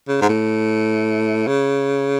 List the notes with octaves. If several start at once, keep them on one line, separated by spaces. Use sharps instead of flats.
C#3
G#2
A2
C#3